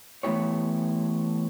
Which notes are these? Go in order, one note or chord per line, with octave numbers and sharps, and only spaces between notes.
E3 A3 B3 E4 G4 C#5